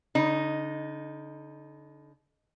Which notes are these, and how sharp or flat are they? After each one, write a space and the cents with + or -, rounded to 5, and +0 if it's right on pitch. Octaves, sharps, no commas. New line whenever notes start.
D3 -35 D#4 +0